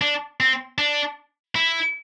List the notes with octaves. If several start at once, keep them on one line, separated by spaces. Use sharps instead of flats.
D4
C4
D4
E4